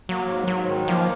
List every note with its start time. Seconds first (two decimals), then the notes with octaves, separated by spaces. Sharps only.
0.09 F#3 A#3
0.29 G#2
0.48 G#2 F#3
0.68 D#3
0.88 F3 A#3